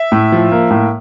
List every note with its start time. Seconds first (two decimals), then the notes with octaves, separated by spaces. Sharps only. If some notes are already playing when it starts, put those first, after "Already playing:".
Already playing: E5
0.12 A2
0.32 F3
0.52 A#3
0.70 A2